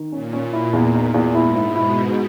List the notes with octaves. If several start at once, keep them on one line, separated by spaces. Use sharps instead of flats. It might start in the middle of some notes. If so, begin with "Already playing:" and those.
Already playing: D#3
A#2 C#4
C#4
E4
E2
D#4
E2
G#2 E4
E4
B2
E4